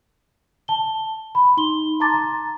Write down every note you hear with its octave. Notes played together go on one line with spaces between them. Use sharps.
A5 G7
B5
D#4 C6 G7
A5 A#5 C6 D6 A6
A#5